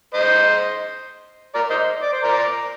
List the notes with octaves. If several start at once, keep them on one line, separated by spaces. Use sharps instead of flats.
C5 D#5
A#4 D5
C5 D#5
D5
C5
A#4 D5